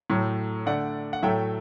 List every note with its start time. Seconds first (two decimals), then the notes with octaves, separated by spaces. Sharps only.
0.10 A2 F#3 A3
0.66 D3 A3 D5 F#5
1.13 F#5
1.23 A2 F#3 A3 E5 G5